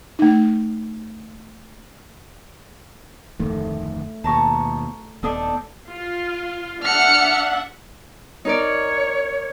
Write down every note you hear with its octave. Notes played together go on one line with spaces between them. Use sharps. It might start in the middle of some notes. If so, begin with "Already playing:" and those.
A3 D#4
D1 F2 D#3 A3
D#2 B2 A5 A#5 C#6
D#1 B3 D4 D#4 A4
F4
D4 E5 F#5 F6 C#7
D#4 A#4 C#5 D5